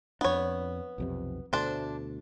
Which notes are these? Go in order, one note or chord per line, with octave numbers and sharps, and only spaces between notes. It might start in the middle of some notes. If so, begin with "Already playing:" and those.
F2 B3 D4 C#5
B1 F2 C3
D2 B2 A3 D4 C5